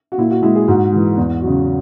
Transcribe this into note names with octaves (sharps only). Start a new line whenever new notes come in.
F#4
A#2 E4
F#4
G#3 E4
G#4
G#2 F#4
E3 G#3
E2
F#3
C#3